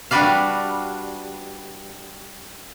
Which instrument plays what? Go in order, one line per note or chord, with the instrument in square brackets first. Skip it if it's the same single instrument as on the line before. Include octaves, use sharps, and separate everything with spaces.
[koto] G3 D4 F#4 B4 D5 F5